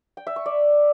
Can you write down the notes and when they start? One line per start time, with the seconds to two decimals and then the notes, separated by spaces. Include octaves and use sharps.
0.17 G5
0.27 E5
0.36 C#6
0.46 D5